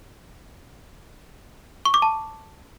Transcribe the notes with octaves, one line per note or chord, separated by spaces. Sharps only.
C#6
D6
A5